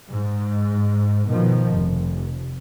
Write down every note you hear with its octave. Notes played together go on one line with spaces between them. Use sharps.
G#2
B2 D#3 F3
F1